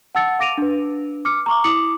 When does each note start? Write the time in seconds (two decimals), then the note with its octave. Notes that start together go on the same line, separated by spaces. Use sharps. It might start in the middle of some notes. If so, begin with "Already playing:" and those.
0.15 F#5 A5 E6 A6 C#7
0.39 F5 D6 A#6 D7 D#7 F7
0.58 D4 B4
1.25 D6 F6 C#7
1.46 A#5 C#6 D6
1.64 E4 D6 D#6 C#7 F#7